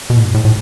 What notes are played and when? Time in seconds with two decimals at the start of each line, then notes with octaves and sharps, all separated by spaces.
0.10 B2
0.17 A2
0.24 G2
0.34 A2
0.45 A2